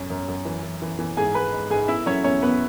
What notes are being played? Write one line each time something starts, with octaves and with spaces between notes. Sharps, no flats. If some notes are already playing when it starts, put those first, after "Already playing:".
Already playing: F#2 C#4
F#2
F#2
E3
E3
E3
E3
G#2 G#4 G#5
G#2 B4 B5
G#3
G#2 G#4 G#5
B3 E4 E5
F#3 C#4 C#5
E2 C#4 C#5
E2 B3 B4